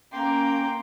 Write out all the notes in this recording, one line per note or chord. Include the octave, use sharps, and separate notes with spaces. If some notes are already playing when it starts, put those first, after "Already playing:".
A#3 C#4 G5 C6 D6